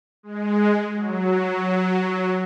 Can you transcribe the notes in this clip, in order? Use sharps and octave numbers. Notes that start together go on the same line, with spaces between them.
G#3
F#3